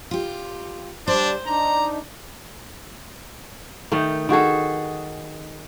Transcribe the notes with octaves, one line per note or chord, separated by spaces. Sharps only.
F4 G4
G3 D4 C5
D4 D#4 A#5
D#3 A3 D#4
D#3 F#4 G#4 A4